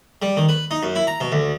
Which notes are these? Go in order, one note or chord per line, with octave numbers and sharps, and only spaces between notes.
G3
D#3
B4
D#4
F#2
E4
A#5
B2
D2